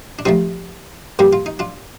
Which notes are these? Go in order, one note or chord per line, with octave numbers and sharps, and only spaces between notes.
D4
C3 F3 A3 C4 D#4
G2 D3 G3 A#3 G4
F4
D#4
D4 F4